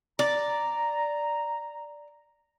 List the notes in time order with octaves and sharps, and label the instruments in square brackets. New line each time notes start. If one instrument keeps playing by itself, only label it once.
[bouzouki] D5 [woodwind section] A#5